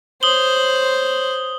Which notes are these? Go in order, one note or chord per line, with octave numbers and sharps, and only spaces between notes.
C5 C#5 D#6 F#7 G7